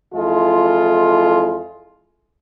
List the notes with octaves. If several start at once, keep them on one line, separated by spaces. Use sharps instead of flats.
F2 E3 G#3 E4 F4 A4